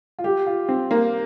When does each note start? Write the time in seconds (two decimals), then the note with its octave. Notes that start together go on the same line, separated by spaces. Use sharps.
0.19 F4
0.24 G4
0.46 F4
0.69 C4
0.91 A#3